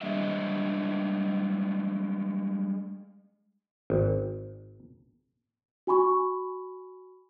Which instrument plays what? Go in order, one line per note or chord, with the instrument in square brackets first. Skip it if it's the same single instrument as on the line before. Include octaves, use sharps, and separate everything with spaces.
[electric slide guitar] G3 G#3 D4 D#5 E5
[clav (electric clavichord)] G#1
[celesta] F#4 G#5 B5 C#6